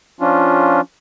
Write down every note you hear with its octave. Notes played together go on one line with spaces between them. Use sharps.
F3 C#4 D4 F4